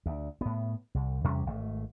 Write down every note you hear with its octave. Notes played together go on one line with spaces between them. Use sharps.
D2
A2 B3
C2
E2 C3 G3 C#4
G#1 A3